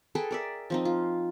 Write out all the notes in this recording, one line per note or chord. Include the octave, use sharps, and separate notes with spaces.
G#4 A4 B4 G5
A#4 D5 E5
F3 C4 D#4
F4